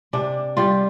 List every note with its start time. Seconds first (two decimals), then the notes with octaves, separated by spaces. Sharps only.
0.13 C3 D4
0.57 G3 F4